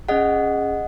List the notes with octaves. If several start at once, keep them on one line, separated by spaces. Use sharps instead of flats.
C#4 G#4 D#5 F#5